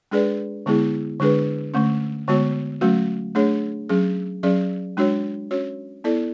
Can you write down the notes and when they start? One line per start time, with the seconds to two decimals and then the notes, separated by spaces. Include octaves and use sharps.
0.11 G#3 D4 G#4 B4 D5
0.66 D3 G#3 B3 E4 G#4
1.20 D3 G#3 D4 G#4 B4
1.74 D3 A3 C#4
2.28 D3 G#3 B3 F#4 C#5
2.81 F#3 A3 C#4 F#4
3.35 A3 D4 G#4 C#5
3.89 F#3 C#4 G#4
4.43 F#3 C#4 G#4 D5
4.97 G#3 D4 F#4 C#5
5.51 C#4 F#4 C#5
6.04 B3 E4 A4 D5